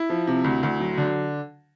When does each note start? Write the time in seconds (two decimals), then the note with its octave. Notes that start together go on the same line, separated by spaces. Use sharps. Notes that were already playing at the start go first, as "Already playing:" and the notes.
Already playing: E4
0.10 F3
0.27 C3
0.44 D2
0.63 D2
0.80 F#3
0.98 D3